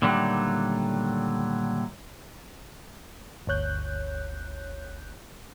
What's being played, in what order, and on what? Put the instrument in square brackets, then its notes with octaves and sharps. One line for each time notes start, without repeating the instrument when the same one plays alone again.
[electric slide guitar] A#2 D3 D#3 F#3 G3 A3
[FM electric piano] G1 D2 C#5 F#6 G6